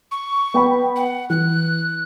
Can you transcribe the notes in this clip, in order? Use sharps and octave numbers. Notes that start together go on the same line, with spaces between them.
C#6
B3 G5 B5
F#5
E3 F#6